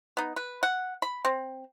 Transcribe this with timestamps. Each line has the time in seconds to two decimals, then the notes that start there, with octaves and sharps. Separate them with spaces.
0.17 B3 D#4
0.36 B4
0.63 F#5
1.02 B5
1.25 C4